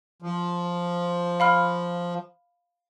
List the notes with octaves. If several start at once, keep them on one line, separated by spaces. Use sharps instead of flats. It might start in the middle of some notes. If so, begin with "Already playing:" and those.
F3
F5 B5 F6